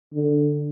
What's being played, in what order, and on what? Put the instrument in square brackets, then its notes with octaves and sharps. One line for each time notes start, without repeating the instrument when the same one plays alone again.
[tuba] D3